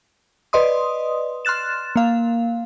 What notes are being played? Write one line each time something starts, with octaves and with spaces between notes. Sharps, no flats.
B4 D5 D#5 C6 D#6
C6 F6 F#6 A6 E7
A#3 F5